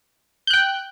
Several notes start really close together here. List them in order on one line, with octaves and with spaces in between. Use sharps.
G6 F#6 G5